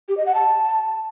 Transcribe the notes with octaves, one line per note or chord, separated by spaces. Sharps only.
G4
D#5
F#5
A5